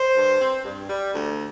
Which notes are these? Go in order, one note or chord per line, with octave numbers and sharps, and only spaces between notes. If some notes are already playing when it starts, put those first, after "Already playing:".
Already playing: C5
G2
C4
G2
G3
D2